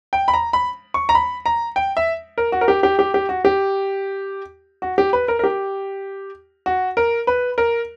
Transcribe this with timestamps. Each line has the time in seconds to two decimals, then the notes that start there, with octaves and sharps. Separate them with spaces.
0.13 G5
0.28 B5
0.34 A#5
0.53 B5
0.94 C#6
1.09 A#5
1.15 B5
1.46 A#5
1.76 G5
1.97 E5
2.38 A#4
2.52 F#4
2.61 A#4
2.68 G4
2.83 G4
2.99 G4
3.14 G4
3.29 F#4
3.45 G4
4.82 F#4
4.98 G4
5.13 B4
5.28 A#4
5.39 A#4
5.44 G4
6.66 F#4
6.97 A#4
7.27 B4
7.58 A#4